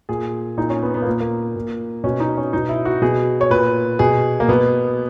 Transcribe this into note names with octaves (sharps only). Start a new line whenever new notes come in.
A#2 G#4
A#2 D#4
C#4
B3
B3
A#3
A#2
A#3
A#2
B2 C#4
D#4
C#4
B2 D#4
E4
F#4
B2 G#4
C#5
A#2 B4
B2 G#4
A#3
B2 B3